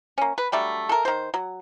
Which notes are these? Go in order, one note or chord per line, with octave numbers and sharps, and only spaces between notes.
A#3 C#4
B4
F#3 G3 A3 D4
A4 A#4
D#3 C5
F#3